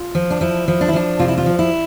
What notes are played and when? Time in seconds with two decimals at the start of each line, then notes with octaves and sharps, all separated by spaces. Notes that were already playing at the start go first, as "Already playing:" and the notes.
Already playing: F4
0.15 F3
0.31 D4
0.41 F3 E4
0.68 F3
0.81 D4
0.88 E4
0.93 F3 D4
1.19 C3 F4
1.28 E4
1.38 F4
1.46 F3
1.59 E4